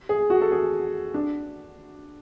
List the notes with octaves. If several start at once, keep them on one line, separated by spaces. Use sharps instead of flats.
G#4
F#4
A4
G#4
D4